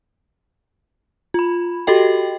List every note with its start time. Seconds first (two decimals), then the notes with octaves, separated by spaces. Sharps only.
1.34 F4 B5
1.87 F#4 G4 A4 D#5 G5